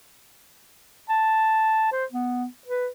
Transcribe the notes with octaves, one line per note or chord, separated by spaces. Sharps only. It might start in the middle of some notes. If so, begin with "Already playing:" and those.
A5
C5
B3
B4